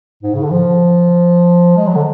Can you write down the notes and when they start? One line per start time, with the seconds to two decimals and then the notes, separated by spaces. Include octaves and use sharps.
0.23 G#2
0.34 C#3
0.43 D3
0.50 F3
1.76 G#3
1.87 F#3
1.95 D3